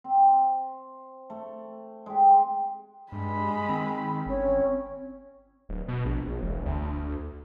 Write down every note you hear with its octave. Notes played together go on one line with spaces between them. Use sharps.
C4
A3
G#3 G4
G2 G#3 B5
D#3 C4
G1 C#4
D1
B2
A#1
A#1
E1
D2